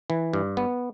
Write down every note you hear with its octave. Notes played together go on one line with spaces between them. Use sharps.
E3
G2
B3